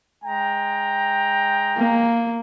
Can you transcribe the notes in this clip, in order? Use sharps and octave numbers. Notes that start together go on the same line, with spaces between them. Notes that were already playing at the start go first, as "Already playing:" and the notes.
G#3 G5 A#5
A#3